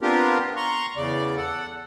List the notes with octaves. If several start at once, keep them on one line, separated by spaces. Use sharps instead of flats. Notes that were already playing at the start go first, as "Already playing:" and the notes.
B3 C4 D4 F4 G4 A#4
A#5 C6 C#6
E2 C#3 D5
A4 F#5